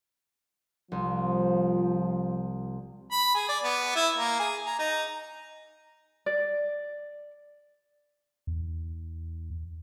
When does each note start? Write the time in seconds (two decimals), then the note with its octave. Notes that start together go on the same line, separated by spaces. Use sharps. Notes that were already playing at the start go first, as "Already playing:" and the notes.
0.92 C2 F3
3.12 B5
3.35 G#4
3.49 D5
3.64 B3
3.95 E4
4.16 A#3
4.39 G#4
4.66 A#5
4.79 D#4
6.26 D5
8.47 E2